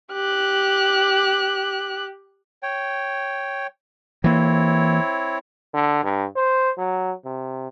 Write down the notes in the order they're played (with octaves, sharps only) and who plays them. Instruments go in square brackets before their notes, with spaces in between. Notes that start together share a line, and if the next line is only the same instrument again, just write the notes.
[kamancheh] G4 F#6
[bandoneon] C#5 G5
[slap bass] E3 A#3 [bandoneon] C4 E4 C#5
[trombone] D3
G2
C5
F#3
C3